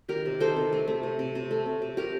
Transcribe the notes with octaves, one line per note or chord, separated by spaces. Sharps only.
D#3 G4 A#4
C3
D#3 A4 C5
C3
A3
A3
C3
C3
C3
A3
C3
C3
A3 G4 A#4